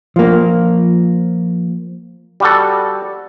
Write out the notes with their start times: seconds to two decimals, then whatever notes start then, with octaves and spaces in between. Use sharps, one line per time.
0.16 F3 A#3
2.40 G3 F#4 A4